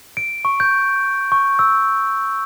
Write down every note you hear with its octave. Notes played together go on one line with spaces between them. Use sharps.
D7
C#6
G6
C#6
E6